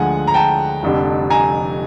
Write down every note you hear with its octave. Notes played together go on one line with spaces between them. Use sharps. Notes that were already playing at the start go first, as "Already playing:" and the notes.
Already playing: D2 D3 F3 G#3 F#5 G#5
A#5
G5 A5
F1 F2 D3 G3
G#5 A#5